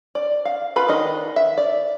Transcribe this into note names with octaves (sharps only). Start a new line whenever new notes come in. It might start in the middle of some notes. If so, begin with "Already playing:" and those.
D5
F5
F4 B4 B5
D#3 D4 D#4 D#5
E5
D5